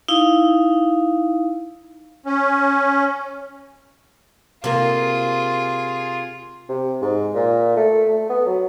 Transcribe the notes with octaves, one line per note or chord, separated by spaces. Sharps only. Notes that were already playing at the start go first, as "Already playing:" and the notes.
D#4 E4 F5
C#4
C3 A#3 F4 G#4
C3
G#2
A#2
A3
A3
B3
F#3